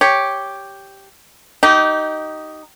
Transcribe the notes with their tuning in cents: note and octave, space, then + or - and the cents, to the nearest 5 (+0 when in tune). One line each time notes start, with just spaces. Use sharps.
G4 +0 C#5 +0
D#4 +0 G4 -25